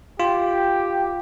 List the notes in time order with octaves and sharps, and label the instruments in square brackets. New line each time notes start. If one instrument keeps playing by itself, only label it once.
[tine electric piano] F4 [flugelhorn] G4